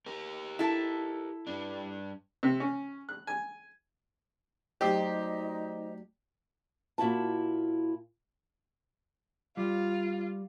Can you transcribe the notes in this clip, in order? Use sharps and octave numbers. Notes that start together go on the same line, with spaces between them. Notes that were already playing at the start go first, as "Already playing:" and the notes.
G4 A#4
E4 A4
G2 D4
C3
C#4
F#6
G#5
F#3 A3 D#4 G4 C5 D5 D#5
A#2 E4 F#4 A5
G3 F4